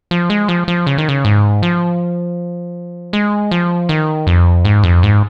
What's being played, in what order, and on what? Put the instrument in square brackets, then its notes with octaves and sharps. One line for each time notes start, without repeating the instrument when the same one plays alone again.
[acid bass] F3
G#3
F3
F3
C#3
D#3
C#3
G#2
F3
G#3
F3
D#3
F2
G#2
F2
G#2